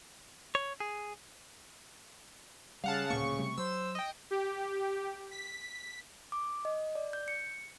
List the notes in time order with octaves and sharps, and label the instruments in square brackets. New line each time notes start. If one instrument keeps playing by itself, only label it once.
[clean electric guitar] C#5
G#4
[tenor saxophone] C#3 [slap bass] G3 [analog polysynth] F5 F#5 A5
[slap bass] D1 A#2 A#3 [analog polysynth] C#6
[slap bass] C3 G3 A3
[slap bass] F#3 [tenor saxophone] C5 [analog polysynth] E6
[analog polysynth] D#5 G5
[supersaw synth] G4
B6
[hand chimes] D6
D#5
D5
G6
C#7